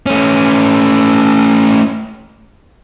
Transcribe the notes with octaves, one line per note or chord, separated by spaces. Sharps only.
A3 C#4